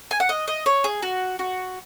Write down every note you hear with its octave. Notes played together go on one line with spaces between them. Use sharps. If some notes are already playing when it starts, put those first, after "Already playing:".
G#5
F#5
D#5
D#5
C#5
G#4
F#4
F#4